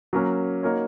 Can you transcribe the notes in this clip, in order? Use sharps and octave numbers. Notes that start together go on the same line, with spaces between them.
F#3 A#3 C#4 A#4
A#3 D#4 F#4 A#4 C#5